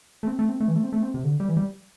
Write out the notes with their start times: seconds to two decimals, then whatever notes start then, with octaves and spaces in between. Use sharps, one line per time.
0.23 A3
0.28 C4
0.39 A3
0.49 C4
0.60 A3
0.68 E3
0.76 A3
0.84 C4
0.92 A3
1.03 C4
1.14 C3
1.24 D3
1.40 G3
1.49 E3
1.57 G3